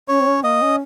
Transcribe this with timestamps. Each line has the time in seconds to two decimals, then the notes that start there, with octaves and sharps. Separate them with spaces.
0.08 C#4 C#5
0.20 C4
0.27 C#4
0.43 A#3 D#5
0.62 C#4